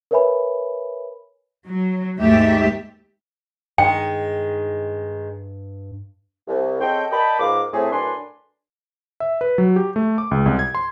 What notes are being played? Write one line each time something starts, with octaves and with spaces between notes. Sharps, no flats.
A#4 B4 C#5 E5 G#5 B5
F#3
D#2 G#2 A3 G4 E5
G2 D#3 G#3 G5
C2
C#3 C4 A4 C#5 D#5 G5
A#4 D5 D#5 G5 A5 B5
C#2 G#2 A#3 F5 D6
A2 A3 C4 G#4
F#2 A2 D4 B4 G#5 C6
E5
B4
F#3
G4
A3
D6
C#2
C2
G#6
C6